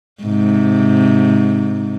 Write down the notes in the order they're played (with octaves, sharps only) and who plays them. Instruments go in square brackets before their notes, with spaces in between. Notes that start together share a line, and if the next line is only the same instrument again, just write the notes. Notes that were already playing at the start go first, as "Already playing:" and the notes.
[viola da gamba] G#2 C3